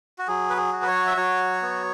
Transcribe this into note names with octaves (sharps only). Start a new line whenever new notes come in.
F#4
F#3 G#4
B4
G#4
F#4
B4
C#5
E5
F#3 C#5
B3